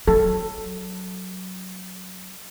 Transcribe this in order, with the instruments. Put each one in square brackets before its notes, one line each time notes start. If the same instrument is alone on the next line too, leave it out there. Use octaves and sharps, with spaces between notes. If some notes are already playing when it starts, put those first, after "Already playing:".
[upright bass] F#3 [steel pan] A4